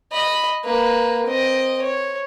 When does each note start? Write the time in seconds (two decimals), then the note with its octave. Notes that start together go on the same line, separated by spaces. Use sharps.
0.12 D#5 B5
0.64 A#3 B4
1.26 C4 D#5
1.82 C#5